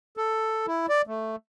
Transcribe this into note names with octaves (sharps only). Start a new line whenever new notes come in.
A4
E4
D5
A3